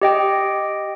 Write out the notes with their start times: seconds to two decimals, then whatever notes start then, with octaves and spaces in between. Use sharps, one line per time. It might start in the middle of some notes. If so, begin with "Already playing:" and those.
0.02 G4 D#5 G5